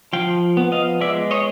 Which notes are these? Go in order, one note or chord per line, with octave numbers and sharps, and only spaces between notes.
F3 F5 G5
B3
D#5 F5
G#3 D5 E5
C#5 D#5